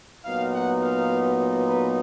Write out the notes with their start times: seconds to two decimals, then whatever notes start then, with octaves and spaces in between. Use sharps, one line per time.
0.24 A#2 F#3 B3 D#4 F5
0.53 F#5
0.82 F5
1.67 B4